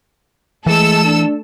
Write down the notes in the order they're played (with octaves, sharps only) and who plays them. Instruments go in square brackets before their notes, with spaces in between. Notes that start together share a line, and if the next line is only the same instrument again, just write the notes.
[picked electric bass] E3 [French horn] G#3 [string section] A3 A4 E6
[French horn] D4